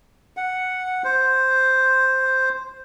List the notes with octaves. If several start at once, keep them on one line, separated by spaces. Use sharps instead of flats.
F#5
C5